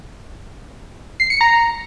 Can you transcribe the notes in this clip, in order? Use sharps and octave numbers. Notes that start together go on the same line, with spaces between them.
C7
C#7
A#5